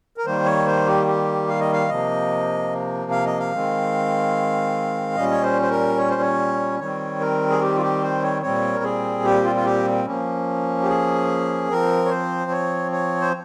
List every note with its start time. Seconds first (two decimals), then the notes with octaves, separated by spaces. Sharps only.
0.17 A#4
0.26 D#3 G3 A#3 C5
0.45 C#5
0.66 C5
0.87 G4
1.07 G4
1.48 F5
1.60 D#5
1.73 F5
1.88 C3 F3 A#3 D#5
3.11 F5
3.25 D#5
3.39 F5
3.53 D#3 G#3 C4
5.15 A#2 G3 C#4 D#5
5.31 C#5
5.43 C5
5.62 C5
5.70 A#4
5.98 C#5
6.10 C5
6.21 C#5
6.79 D#3 G3 C4 C#5
7.20 A#4
7.50 G#4
7.61 G4
7.77 F4
7.81 G4
8.02 C5
8.22 C#5
8.42 A#2 G3 C4 C#5
8.75 A#4
8.83 G#4
9.25 G4
9.44 F4
9.56 F4
9.65 G4
10.06 F3 A#3 C#4
10.83 G4
10.88 G#4
11.70 F3 C4 A#4
12.05 C#5
12.10 C5
12.51 C#5
12.92 C#5
13.21 C5